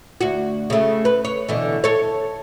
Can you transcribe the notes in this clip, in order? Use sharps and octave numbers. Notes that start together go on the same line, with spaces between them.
D2 F#4
C#3 A3
B4
C#5
B2 D3 E3
A4 C#5